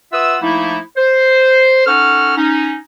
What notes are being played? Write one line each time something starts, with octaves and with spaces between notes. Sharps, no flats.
F4 B4 E5 F#5 D#6 E6
F3 A3 A#3 D#4 E4
C5
C#4 D#4 A4 F#5 C#6 F6
C#4 D#4